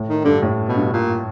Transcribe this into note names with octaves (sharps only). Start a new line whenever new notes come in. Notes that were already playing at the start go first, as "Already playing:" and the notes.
Already playing: A2
D#3
G2 D3
A2
B2
G2
A#2